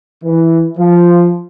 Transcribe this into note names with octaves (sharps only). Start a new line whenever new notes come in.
E3
F3